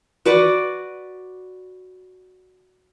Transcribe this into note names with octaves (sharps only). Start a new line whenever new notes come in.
F#4 B4 D5 F#5